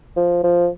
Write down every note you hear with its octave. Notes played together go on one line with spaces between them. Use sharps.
F3
F3